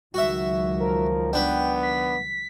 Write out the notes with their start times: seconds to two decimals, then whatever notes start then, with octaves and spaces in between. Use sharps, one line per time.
0.14 C#2 D#3 F#3 F#4 E5
0.80 F3 A#4
1.33 B3 D4 B4 G5
1.83 B6